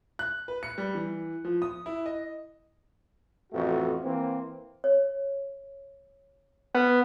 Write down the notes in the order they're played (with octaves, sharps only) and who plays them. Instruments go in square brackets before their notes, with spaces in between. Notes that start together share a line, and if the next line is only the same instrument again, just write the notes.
[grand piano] F#6
B4
C#7
G3
E3
F3
D#6
E4
D#5
[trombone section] A1 F2 A3 F#4
E3 A#3 C4
[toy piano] C#5
[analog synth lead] B3 [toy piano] B4